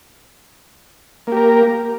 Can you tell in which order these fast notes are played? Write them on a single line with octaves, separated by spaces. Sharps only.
A#3 G4 A#4